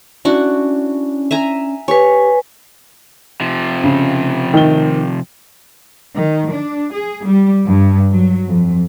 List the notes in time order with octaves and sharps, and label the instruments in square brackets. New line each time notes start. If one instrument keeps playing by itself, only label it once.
[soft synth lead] C#4 [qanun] D4 E4 F#4
[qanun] E5 G#5 A#5
[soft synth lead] G4 [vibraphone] B4 G#5 [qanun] C#5
[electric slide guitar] C3 F3
[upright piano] C#3
D#3 G7
[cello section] D#3
D4
G#4
G3
G2
F#3
F2